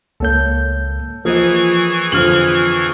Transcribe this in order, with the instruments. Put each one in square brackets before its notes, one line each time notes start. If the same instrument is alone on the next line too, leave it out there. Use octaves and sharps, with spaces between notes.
[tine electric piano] C#2 A#3 G6 [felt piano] A4 C#5
[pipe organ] E3 G#4 C#6 [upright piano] F3 [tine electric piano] A#3 [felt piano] A#4 D#5
[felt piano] F2 D3 [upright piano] F3 F6 F#7